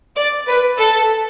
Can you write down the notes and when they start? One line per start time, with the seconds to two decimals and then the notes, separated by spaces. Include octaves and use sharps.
0.17 D5
0.48 B4
0.78 A4